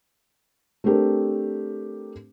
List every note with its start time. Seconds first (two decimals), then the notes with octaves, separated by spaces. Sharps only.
0.84 A3 C4 D4 G4 A#4